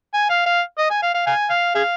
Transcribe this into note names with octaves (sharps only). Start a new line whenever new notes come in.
G#5
F5
F5
D#5
G#5
F5
F5
F5 G#5
F5
G#4 F5